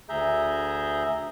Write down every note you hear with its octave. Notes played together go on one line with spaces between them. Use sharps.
D2 G#4 E5 A#5 G6